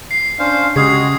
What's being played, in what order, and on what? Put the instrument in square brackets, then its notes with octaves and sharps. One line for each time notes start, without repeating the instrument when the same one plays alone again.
[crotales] C7
[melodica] C#4 C5 F5 [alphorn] D4
[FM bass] C#3 [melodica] G#3 F#4 [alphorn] G4 [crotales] D#6 G#6 C7